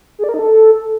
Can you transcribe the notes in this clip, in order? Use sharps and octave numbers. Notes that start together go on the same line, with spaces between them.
G#4
D5
A#4
D#4
A4